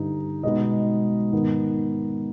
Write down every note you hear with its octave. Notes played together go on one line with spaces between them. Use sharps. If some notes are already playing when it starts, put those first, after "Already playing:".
Already playing: G2 D3 G3 D#4
B2 G#3 B3 D#4 D#5
G#2 D#3 B3